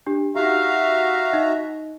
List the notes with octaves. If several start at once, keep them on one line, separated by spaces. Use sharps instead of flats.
D4 G4
D#4 F#4 G4 E5 F5 A#5
D#4 D#5